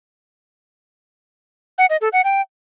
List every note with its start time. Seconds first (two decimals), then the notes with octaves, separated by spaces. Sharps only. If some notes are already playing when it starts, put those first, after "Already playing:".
1.78 F#5
1.90 D#5
2.01 A4
2.13 F#5
2.24 G5